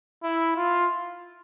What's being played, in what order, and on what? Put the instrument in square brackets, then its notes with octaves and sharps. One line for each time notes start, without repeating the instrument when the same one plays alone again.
[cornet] E4
F4